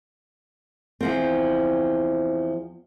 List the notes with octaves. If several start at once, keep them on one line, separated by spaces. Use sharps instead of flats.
E2 F3 C4